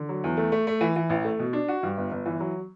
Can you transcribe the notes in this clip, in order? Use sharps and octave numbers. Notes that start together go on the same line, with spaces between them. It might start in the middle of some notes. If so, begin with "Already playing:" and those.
Already playing: D3
F#3
E2
A3
A3
A3
E3
E3
A1
A3
B2
D4
F#4
G2
G1
G1
E3
F#3